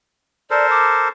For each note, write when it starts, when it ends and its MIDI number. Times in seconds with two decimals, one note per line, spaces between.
0.51 1.08 69
0.51 1.08 70
0.51 1.08 72
0.51 0.69 74
0.70 1.06 86